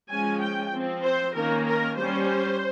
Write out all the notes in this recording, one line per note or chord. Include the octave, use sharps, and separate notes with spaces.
F3 G#3 C#4 G#5
G5
F3 C4
C5
D#3 A#3 C#4 A#4
A#4
G3 C#4 C5